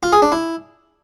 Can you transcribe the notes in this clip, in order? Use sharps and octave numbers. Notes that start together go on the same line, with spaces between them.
F4
G#4
D4
E4